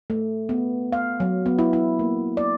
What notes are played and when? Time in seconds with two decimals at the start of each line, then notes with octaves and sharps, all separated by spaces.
0.10 A3
0.49 B3
0.92 F5
1.20 F#3
1.46 B3
1.59 E4
1.73 E4
1.99 A#3
2.37 D5